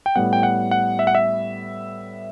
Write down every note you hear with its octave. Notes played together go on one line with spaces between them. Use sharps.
G5
A2 G3 B3 F#5
G5
F#5
F#5
E5
F#5
E5